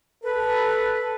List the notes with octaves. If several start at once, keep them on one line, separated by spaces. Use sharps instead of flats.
A4 B4